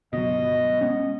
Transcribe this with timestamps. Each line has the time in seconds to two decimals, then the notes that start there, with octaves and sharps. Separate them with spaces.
0.13 G1 C#2 B2 F#3 D#5
0.81 G#3 B3 C#4